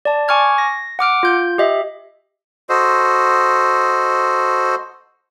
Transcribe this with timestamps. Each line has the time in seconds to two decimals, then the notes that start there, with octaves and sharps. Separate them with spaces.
0.05 D5 A5
0.28 G#5 C#6 D6 F6 G#6
0.58 A#6
0.99 F#5 D6 F6 D7
1.23 F4 G6
1.58 G4 D#5 E5
2.69 F#4 A4 C5 D#5